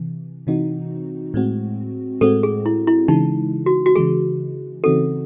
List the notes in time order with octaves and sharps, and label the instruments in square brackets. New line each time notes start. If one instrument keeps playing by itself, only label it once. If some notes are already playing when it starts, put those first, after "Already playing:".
Already playing: [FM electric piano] C3 E3
C3 E3 C4 D#4 F#4
A2 G#3 C4 F#4
[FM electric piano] A2 G#3 C4 F#4 [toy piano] A4
[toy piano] G#4
E4
E4
[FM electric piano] C#3 E3 G#3 [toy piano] D#4
[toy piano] F#4
F#4
[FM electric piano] C#3 E3 G#3 [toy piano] G#4
[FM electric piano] C#3 E3 C4 D#4 F#4 [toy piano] A4